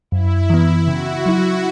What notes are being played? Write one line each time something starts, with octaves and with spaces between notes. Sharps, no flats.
F#2 E4
E3 B3
C#3 F#4
F#3 E4